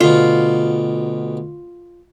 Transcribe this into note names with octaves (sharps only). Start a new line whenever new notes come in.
D2 B2 F4